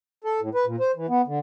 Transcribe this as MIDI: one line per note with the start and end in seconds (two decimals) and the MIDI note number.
0.24 0.40 69
0.41 0.49 45
0.55 0.65 71
0.66 0.76 46
0.80 0.91 72
0.96 1.06 52
1.09 1.22 59
1.27 1.39 50